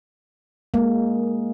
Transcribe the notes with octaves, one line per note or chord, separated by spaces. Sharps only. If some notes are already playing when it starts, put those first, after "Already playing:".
G#3 A#3